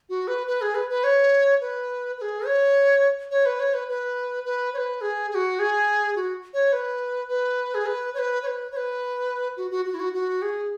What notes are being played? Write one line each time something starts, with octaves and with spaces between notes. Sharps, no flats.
F#4
B4
B4
G#4
B4
B4
C#5
B4
B4
G#4
C#5
C#5
B4
C#5
B4
B4
B4
C#5
B4
G#4
G#4
F#4
G#4
F#4
C#5
B4
B4
G#4
B4
C#5
B4
C#5
B4
C#5
B4
F#4
F#4
F#4
E4
F#4
F#4
G#4